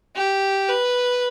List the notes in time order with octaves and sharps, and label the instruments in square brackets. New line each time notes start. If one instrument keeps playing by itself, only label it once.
[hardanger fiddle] G4
B4